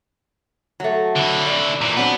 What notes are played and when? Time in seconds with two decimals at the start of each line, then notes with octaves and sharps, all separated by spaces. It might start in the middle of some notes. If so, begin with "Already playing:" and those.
0.80 F#3 A3
1.16 D3 E4
1.47 D5
1.81 A#2 E3
1.97 F#3 B3 C4 D4